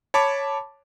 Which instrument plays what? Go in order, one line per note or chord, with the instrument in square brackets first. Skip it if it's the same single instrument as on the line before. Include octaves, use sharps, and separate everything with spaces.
[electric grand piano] C#5 A5 B5 D6